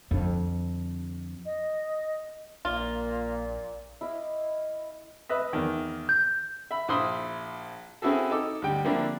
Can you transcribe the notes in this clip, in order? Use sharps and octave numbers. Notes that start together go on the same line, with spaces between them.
F2 D3
D#5
A#1 A#2 A#3 F4
E4 D#5 F5 D6
B4 D#5 E5
E2 D#3
G6
E5 B5
A#1 E4 C5 B5 C6 D#6
C4 C#4 E4 F#4 G#4 A4
D#4 A4 D6
D2 G3 G5
D3 F3 A#3 C4 D4 E4